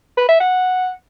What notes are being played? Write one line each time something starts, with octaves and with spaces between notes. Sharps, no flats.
B4
E5
F#5